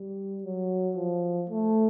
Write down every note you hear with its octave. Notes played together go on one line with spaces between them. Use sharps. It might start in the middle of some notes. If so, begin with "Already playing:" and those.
Already playing: G3
F#3
F3
A3